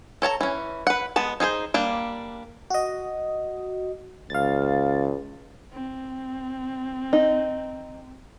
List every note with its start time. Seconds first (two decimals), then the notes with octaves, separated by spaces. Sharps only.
0.22 A4 C#5 A5 A#5
0.41 E3 C#4
0.87 B4 F#5
1.16 G#3 B3 A5
1.40 D#4 G#4 A4 C5
1.74 G3 A#3 D4
2.70 F#4 D#5
4.30 C#2 F5 A6
5.72 C4
7.13 D#4